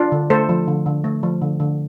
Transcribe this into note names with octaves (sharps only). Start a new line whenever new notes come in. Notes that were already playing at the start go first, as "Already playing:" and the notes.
Already playing: D4 F4
D3
A3 A4 C5
F3
D3
D3
A3
F3
D3
D3